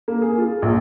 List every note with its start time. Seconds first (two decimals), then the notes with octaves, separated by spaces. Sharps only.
0.08 A#3
0.22 G#4
0.38 F4
0.62 A#1